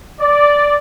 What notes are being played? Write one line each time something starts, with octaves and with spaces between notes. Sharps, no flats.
D5